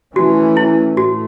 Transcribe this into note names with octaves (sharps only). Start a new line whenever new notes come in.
E3 A3 C#4 F#4
E4
A2 A3 F#4